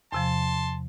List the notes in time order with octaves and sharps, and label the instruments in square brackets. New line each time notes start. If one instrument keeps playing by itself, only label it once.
[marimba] E2 C3 F3 [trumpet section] A5 C6